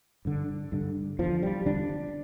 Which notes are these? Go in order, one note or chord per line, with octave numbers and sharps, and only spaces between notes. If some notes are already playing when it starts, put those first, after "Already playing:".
G2 D3
G2 D3
E2 D3 F3
G3
E2 D3 D4